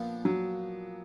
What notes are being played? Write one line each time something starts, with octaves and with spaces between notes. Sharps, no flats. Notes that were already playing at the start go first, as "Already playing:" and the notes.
Already playing: A#2 F3 B3 D4
F#3